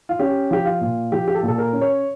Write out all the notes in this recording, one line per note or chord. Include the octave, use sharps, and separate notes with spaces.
F4
C#4 G4
F3 G4
F4
A#2
F3 G4
G4
A4
A#2
A4
A#4
C#4
C#5